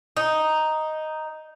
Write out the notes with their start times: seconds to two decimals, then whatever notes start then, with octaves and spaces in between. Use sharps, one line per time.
0.17 D#4